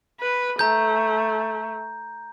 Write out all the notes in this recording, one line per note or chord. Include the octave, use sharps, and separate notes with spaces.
B4
A3 A#5 G6